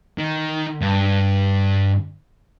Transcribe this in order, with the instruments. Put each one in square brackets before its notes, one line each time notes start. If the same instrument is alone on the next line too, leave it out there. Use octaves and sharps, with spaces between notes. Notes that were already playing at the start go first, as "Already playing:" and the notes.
[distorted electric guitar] D#3
G2